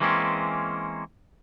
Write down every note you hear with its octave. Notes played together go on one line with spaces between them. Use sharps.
E3 G#3 A#3 C4 C#4